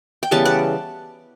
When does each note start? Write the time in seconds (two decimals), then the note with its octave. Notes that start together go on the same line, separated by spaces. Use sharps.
0.23 G5
0.31 C#3 E3 G3 B3 F#5 A5
0.45 D5 F#5